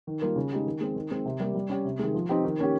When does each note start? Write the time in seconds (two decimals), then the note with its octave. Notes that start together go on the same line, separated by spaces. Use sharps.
0.07 D#3
0.22 G3 A#3 F4
0.36 C#3
0.52 G#3 D#4 G4
0.66 D#3
0.81 G#3 C4
0.96 D#3
1.11 G#3 C4
1.26 C3
1.40 G3 A#3
1.54 G3
1.69 C#4 G4
1.85 C3
1.99 D#3 G#3
2.14 F3
2.29 C4 D#4 G4
2.45 D#3
2.59 A#3 C#4 G4